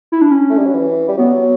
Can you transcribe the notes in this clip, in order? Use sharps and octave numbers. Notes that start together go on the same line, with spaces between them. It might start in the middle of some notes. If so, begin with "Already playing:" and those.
E4
D4
C#4
A3
G3
F#3
E3
G3
F#3 B3